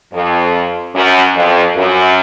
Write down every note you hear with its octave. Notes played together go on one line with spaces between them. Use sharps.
F2
F#2
F2
F#2